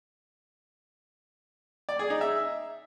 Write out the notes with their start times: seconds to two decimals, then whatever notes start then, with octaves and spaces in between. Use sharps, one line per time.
1.89 D5
1.99 G#4
2.10 D#4
2.21 E5